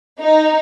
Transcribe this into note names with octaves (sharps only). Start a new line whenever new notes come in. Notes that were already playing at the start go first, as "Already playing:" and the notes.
D#4